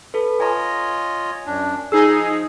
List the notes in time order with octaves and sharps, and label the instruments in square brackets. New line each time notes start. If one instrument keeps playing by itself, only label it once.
[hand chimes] A4 B4
[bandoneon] F4 C#5 D#5 [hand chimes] G#5 A#5
[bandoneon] F#2 D4
[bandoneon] F3 [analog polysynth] D#4 G#4 [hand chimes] E6 C7